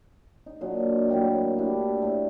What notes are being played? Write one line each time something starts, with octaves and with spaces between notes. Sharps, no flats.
D#4
A#2 D3 F#3 D#5
A2 F#3 A#3 G5
D3 D4 E4 G4
A2 A3